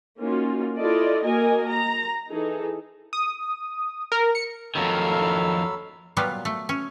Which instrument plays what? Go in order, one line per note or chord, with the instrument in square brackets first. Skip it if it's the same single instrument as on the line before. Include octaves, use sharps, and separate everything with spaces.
[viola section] A#3 C#4 D#4 F4 F#4
E4 F4 A4 D5 D#5
A#3 F#4 A#4 D#5 G#5
A#5
E3 D#4 G#4 A4
[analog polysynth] D#6
A#4
C#7
[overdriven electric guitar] F2 D#3 [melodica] F#3 B5 E6 [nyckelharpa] A4 F5
[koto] A#2 F#3 G3 B3 F4
A3
C#4